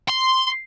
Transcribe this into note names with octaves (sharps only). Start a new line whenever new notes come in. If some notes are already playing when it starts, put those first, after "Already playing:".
C6